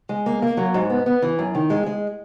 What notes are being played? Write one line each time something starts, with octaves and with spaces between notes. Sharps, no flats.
G#3
A#3
A#3
F#3
G#2
B3
B3
E3
F#2
D#3
G#3
G#3